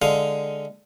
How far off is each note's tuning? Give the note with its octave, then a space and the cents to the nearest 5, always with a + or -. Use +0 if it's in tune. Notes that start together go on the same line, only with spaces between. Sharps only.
D3 +0 G#3 +0 F5 +0